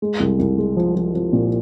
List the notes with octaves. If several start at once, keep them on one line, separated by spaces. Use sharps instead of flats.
G#3
C2
C2
G#3
F3
F3
F3
A#2